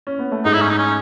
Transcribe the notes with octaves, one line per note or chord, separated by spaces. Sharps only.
C#4
B3
A3
G#2 G#3 D#4
E4
C#4
D#4
C#4